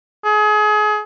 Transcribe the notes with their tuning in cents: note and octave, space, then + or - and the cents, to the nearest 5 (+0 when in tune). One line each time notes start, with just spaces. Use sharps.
G#4 +30